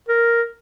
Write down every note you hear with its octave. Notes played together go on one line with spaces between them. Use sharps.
A#4